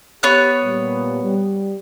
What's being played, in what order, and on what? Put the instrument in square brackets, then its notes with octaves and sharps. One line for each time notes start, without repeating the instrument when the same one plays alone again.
[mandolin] B3 C#5 F#6 [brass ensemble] G4
[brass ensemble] A#2 G3
G3